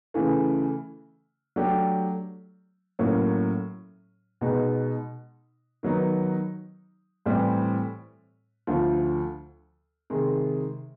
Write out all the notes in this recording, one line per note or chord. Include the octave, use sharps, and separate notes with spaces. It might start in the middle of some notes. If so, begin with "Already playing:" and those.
C#3 E3 A3
F#3 A3 D4 G4
A2 F#3 A#3 C#4
B2 G#3 B3 D#4
D#3 F#3 B3 D#4
A2 E3 G3 C4
D2 D3 F3
C3 D#3 G#3